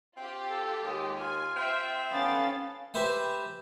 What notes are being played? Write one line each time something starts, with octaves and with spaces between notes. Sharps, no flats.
C4 F4 G4
A4
D#2 G#3
F4 G#5
C4 E5
B3 C#4 A4 F5 A6
G4 B4 C5 E5 G#5